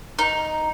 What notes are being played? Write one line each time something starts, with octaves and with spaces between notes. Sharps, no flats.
D#4